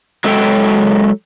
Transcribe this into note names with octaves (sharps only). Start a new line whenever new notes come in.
F#3 G#3 A4 C#5 G5